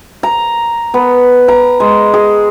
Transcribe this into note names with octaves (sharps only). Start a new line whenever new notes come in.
A#5
B3
A#5
G#3
G#4